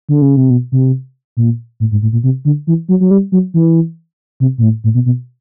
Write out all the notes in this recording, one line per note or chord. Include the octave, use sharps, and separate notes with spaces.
D3
C#3
C3
B2
C3
A#2
A2
G#2
A2
A#2
C3
D3
E3
F#3
F#3
G3
F#3
E3
C3
A#2
A2
A2
B2
B2